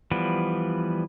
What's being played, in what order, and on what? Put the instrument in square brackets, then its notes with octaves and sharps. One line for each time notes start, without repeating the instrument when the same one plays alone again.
[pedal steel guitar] E3 F3 G3 B3